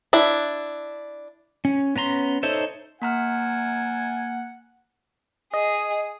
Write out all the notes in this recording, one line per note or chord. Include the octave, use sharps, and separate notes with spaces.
D4 E4
C#4
B3 C#4 A#5 C6
D#4 A4 C5 C#5 E5
A#3 F#5 G#5 A#5 F6
G#4 D#5